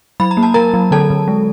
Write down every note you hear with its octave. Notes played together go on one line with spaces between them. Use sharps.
F#3 B5
A#5
A#3
A5
F#3 A#4 A#5
F#3
D3 A4 A5
D3
G#3